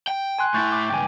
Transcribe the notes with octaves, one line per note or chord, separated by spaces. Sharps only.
G5
G#5 C6 F#6
A2 E4 C#6 G6 A6
D6
C#2 G2 G5 G#5